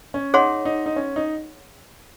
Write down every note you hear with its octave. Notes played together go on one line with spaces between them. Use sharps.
C#4
D#4 G#4 C#5 F#5 C6
D#4
D#4
C#4
D#4